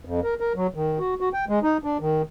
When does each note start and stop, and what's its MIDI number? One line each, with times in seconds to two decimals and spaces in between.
0.05 0.20 41
0.23 0.34 70
0.40 0.53 70
0.56 0.67 54
0.74 0.98 51
0.99 1.14 66
1.20 1.29 66
1.33 1.45 79
1.49 1.59 56
1.63 1.77 63
1.84 1.97 62
2.00 2.22 51